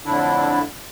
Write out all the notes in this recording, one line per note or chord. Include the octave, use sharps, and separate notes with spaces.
F2 A2 D3 D4 E4